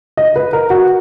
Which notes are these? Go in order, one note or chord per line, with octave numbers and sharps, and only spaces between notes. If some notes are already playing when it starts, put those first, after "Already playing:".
D#5
B4
A#4
F#4